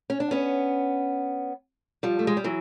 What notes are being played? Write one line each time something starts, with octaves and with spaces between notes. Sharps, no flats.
C#4
D4
B3 C#4
F3 G3
A3
G#3
G3
E3 F#3